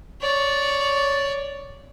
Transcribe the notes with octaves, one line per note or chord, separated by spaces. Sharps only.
C#5 D5